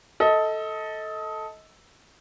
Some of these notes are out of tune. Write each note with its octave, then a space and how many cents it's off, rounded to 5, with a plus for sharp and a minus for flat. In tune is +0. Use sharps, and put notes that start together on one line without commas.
A4 +0 D#5 +25